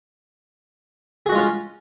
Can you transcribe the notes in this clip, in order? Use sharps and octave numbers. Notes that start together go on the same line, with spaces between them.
G#3 C#4 F4 F#4 G#4